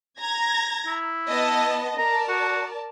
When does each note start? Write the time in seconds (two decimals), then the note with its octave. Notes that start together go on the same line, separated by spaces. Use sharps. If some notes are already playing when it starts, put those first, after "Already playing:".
0.20 A#5 G#6 A#6
0.87 E4
1.29 B3 D#5 A5
1.99 A#4 D5 A5 A#5
2.29 F#4